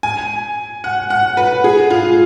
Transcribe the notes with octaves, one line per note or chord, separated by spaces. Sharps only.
G#5
F#5
F#5
B4
G#4
F4